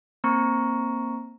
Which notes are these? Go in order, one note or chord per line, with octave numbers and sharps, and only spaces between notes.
A#3 C4 A#5 C#6